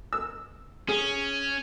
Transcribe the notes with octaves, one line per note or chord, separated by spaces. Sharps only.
E6
C#4 G#4